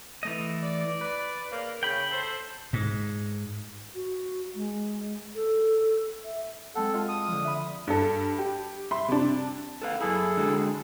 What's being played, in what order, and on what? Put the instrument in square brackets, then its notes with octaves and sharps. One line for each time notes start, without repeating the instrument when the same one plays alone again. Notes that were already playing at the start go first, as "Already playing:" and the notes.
[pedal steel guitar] E3 A3 D#5
[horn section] D5
[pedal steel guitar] B4
[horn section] C#3 A#3
[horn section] C#3 [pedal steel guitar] G5 B5
[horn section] A4 C5
[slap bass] G#2
[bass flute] F#4
G#3
A4
E5
[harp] G#3 C4 F#5 [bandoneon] A4
[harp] F4 D#5 F6
[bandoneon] D#6
[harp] D3 F3
E5 B5
[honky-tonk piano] G2 A4
G4
E5 B5 C6
C3 D4
[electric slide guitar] A4 B4 F5
[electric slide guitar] F#2 E4 [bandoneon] G#4 A4
[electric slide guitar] D3 G#3 F#4